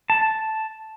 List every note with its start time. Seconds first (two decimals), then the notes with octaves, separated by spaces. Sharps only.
0.10 A5